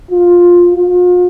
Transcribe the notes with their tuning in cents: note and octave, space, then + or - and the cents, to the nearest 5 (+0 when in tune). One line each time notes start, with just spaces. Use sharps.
F4 +10
F4 +40